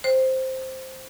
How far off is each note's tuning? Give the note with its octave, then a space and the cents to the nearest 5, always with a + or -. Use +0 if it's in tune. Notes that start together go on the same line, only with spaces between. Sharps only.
C5 +0 G5 +0